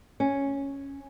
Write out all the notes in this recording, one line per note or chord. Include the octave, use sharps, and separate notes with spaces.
C#4